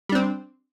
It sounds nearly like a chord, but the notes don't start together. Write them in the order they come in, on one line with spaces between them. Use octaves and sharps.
G3 D4 C4